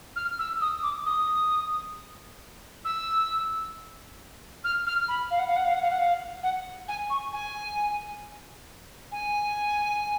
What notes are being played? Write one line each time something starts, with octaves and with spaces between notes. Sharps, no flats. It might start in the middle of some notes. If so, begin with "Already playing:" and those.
F6
E6
D#6
D6
D#6
E6
F6
F6
B5
F5
F#5
F5
F#5
F5
F#5
F5
F#5
F5
F#5
G#5
C#6
G#5
G#5